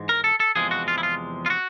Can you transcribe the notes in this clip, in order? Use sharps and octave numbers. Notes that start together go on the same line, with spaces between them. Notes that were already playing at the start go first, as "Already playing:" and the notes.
Already playing: G#2 E3 G#3
A#4
A4
A4
E2 C3 F3 G#3 G#4
F#4
F4
E4
F4
F4
F#4